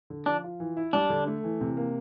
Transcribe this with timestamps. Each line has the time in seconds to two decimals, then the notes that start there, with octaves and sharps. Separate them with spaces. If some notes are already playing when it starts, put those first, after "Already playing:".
0.10 D3
0.26 F3 D4
0.44 F4
0.60 E3
0.77 E4
0.93 G3 D4
1.10 D3
1.27 A3
1.44 E3
1.61 C3
1.77 A#3